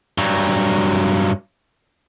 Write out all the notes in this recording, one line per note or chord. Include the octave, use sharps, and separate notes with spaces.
G2 F#3